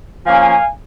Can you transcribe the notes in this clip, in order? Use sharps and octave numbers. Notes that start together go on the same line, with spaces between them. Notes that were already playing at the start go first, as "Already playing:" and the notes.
F3 A#3 C#4 F5 G#5